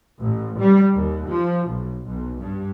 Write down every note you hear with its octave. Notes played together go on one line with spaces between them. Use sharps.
A1
G3
D#2
F3
B1
B1
G2